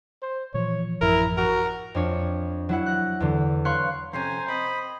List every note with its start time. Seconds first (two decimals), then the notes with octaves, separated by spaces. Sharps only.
0.22 C5
0.54 A#2 E3 F3 C#5
1.02 A1 F#2 F3 E4 A#4
1.38 F#4 A#4
1.95 F2 D4 C#5
2.69 F#3 E4 F#5
2.86 F#6 A#6
3.20 E2 D3
3.65 B4 C#5 F5 C6 C#6 F#6
4.13 F2 C3 C#4 C5 G#5 A#5
4.48 C4 D#5 B5